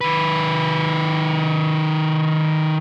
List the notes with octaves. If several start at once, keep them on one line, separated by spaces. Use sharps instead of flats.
D#3 B4